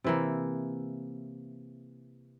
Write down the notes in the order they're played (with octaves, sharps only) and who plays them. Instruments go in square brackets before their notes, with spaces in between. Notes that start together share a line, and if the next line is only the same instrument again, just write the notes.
[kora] C3 E3 A#3